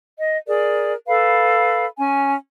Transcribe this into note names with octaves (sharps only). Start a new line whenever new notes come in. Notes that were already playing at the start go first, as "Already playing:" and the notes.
D#5
G#4 A#4 D5
A4 B4 F5 B5
C#4 G#5